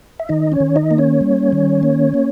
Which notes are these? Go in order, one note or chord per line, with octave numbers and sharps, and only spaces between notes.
E5
D#3 D#4 D#5
C#4 C#5
D#3
D#4 D#5
A#3
C#4 C#5
G3
D#3
A#3
A#3